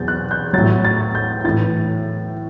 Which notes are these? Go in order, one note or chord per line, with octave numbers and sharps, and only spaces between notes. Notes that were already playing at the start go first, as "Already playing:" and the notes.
Already playing: E2 B2 F#3 G6 A6
F#6
G6
A2 F#3 A6
A6
G6
A2 E3 A6